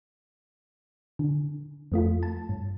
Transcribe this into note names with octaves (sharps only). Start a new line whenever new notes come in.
D3
F2 A3 F4
A5
G2